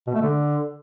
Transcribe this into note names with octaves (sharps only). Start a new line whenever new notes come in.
B2
A3
D3